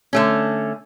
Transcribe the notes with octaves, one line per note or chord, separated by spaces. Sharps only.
D3 A3 C#4